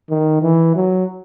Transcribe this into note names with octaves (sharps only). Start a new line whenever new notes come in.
D#3
E3
F#3